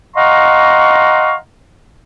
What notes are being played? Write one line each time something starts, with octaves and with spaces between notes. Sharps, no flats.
D#5 F5 F#5 A#5 C6 C#6